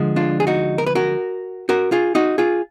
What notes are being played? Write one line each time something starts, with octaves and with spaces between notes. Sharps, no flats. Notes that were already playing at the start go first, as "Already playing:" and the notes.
Already playing: D2 D3 F3 G#3
D4 F4
G#4
D#4 F#4
A#4
B4
F#4 A#4
F#4 A#4
F4 G#4
D#4 F#4
F4 G#4